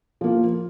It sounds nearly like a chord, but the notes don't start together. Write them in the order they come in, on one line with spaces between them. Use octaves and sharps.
F3 A#3 F4